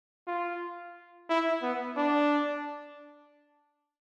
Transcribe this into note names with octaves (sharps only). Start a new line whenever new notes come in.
F4
E4
B3
D4